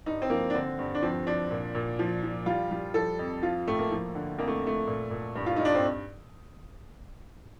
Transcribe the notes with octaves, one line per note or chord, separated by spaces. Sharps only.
G2 D#4
C4
F3 A#3
D4
D3 C4
G2
D4
F3 C4
F3 D4
A#2
A#2
F3
F3
G3 F4
G3
F3 A4
F2
F3 F4
A2 A3
A#3
F3
D3
F2 A#3
A3
F2 A3
A#2
A#2
G2
F4
G2 D#4
D4
C4